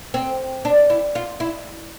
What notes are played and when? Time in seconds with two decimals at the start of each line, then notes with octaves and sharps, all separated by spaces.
0.14 C4
0.65 D4
0.90 E4
1.15 F4
1.40 E4